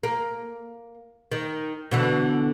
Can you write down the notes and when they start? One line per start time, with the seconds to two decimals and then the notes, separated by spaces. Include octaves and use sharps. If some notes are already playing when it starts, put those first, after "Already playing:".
0.03 A#3
1.32 D#3
1.91 B2 D3 E3